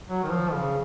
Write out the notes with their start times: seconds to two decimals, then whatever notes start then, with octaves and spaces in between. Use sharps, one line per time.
0.09 F#3
0.24 D#3
0.30 F3
0.53 C#3